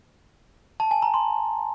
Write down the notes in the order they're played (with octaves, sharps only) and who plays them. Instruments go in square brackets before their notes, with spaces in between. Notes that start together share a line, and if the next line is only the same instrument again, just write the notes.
[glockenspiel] A5
G#5
A#5
C6